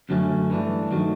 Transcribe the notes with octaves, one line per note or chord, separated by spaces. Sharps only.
F#2 D3 F#3 A3 C#4
G2 E3 A3 D4
D#3 F#3 A3